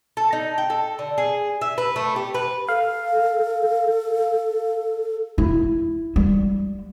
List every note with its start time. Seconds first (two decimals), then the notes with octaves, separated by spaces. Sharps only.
0.17 A4
0.33 D#4
0.58 G5
0.70 A4
0.99 D3
1.18 G#4
1.61 E5
1.78 B4
1.96 A3
2.16 G4
2.34 B4
2.68 A4 F5
5.38 E4
6.16 G3